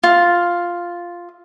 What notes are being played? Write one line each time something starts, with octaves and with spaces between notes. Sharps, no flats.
F4